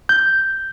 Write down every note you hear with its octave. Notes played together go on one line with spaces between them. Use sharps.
G6